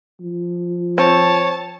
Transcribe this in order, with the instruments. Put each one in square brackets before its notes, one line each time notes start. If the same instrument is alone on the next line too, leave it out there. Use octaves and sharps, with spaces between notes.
[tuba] F3
[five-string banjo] C4 [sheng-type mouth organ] C#5 [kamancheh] A5